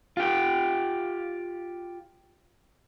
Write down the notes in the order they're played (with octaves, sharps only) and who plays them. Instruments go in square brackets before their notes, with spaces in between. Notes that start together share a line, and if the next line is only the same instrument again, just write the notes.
[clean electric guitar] F4 G4